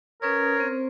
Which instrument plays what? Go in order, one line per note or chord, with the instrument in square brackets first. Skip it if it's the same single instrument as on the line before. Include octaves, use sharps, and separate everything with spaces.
[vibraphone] C#4 B4 D#6 [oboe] A#4 [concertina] C#5
[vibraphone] C4 C5